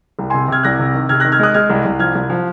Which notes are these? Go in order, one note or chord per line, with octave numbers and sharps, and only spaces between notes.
C2
C3 G#5 C6
C3 F6 G#6
C2 F#6 A#6
C3
D#3
C3 F6 G#6
D#3 F#6 A#6
F6 G#6
G#3 D#6 F#6
G#3 F6 G#6
C2
C2
F3 F6 G#6
C2
F3